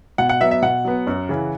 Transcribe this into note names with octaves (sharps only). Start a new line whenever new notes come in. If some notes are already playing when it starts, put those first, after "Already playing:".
B2 F#5
F#5
F#3 B3 E5
E5
B2 F#5
F#3 B3
F#2
C#3 E3